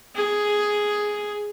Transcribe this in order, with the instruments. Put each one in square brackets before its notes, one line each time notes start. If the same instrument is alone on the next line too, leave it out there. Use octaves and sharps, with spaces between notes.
[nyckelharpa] G#4